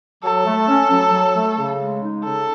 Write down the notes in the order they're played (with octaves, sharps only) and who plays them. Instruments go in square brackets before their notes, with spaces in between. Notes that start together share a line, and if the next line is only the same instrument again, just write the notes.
[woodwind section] F#3 [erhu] A4
[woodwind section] A3
C#4
F#3
F#3
A3
C#3
G#3
D#4
[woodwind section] C#3 [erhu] A4